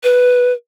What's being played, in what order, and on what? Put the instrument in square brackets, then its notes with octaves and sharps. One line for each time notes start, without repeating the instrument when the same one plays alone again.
[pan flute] B4